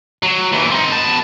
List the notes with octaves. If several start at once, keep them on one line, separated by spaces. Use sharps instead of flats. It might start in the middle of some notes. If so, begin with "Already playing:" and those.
F#3
D#2 E3
C4 D#4
B3 A5